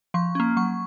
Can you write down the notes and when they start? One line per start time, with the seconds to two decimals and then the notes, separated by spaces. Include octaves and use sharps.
0.14 F3 C#6
0.35 A#3 C#4
0.57 F#3 C#6